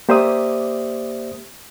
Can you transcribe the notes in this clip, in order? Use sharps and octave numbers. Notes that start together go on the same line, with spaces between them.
A#3 G4 C5 D5 E5 D#6